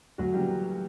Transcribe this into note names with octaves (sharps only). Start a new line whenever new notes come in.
D2 F#3 F#4
C#3 E3 G3 A#3 G4